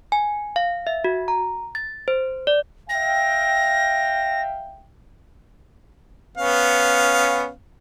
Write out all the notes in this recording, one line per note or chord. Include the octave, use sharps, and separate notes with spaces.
G#5
F5
E5
F#4
A#5
A6
C5
D5
E5 F5 G5 A#6
B3 C#4 F5